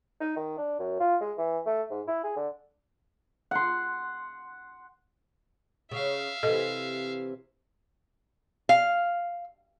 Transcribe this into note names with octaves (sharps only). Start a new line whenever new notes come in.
D#4
D#3
D4
F#2
F4
G#3
E3
A3
G#2
E4
G#4
D3
F#5 C6
C#3 E5 F5
C3 E3 A4 D#5
F5